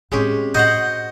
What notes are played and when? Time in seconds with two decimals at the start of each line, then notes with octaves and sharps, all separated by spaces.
0.12 A2 G#3 C4 C#4 G4
0.55 A2 F#4 C5 D#5 F#5 G6